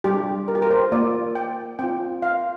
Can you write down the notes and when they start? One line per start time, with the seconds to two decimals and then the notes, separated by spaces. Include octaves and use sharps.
0.04 G3 D4 G4
0.48 A#4
0.55 G4
0.62 A#4
0.71 C5
0.92 A#3 F4 D5
1.35 G5
1.79 C4 F4 G5
2.22 F5